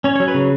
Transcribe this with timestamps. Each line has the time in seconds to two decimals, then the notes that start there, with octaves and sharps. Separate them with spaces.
0.04 C#4 C#5
0.16 C#5
0.20 F#3
0.28 B4
0.34 C#3